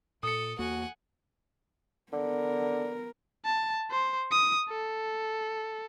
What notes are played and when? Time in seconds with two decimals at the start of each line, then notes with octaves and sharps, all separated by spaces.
0.23 A#2 A4 D#6 C#7
0.59 E2 A#3 F#4 F#5 G#5
2.12 D3 B3 A#4
3.45 A5
3.91 C5
4.31 D#6
4.69 A4